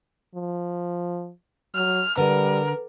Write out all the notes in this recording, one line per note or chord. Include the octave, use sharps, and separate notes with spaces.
F3
F#3 F6
D3 G3 A#4 B4